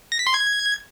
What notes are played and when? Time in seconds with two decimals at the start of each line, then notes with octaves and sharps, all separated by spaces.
0.12 A#6
0.19 B6
0.27 C6
0.34 G#6